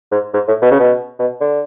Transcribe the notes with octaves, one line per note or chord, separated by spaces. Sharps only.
G#2
G#2
A2
B2
C#3
B2
B2
D3